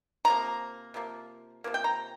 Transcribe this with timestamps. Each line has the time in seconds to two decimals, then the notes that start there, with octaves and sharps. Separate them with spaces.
0.25 C3 F3 A#3 A#5
0.94 C3 F3 A#3
1.64 C3 F3 A#3
1.74 G5
1.84 A#5